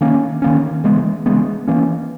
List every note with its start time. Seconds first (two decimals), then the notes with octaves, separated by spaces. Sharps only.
0.01 D#3 A#3 C#4
0.42 D#3 A#3 C#4
0.84 C#3 E3 G#3 B3
1.26 C#3 E3 G#3 B3
1.68 E3 A#3 C#4